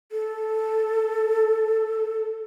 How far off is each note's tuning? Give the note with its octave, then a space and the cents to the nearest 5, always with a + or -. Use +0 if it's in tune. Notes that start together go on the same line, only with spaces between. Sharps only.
A4 -5